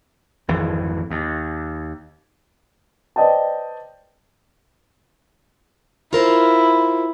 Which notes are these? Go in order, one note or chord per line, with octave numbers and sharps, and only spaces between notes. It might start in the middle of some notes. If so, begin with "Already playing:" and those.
G#1 F2 E3
D#2
B4 C5 D5 D#5 G5 A5
E4 F4 A#4 C5